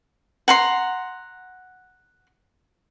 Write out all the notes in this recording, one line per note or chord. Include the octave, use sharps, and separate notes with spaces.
F#5 A#5 C6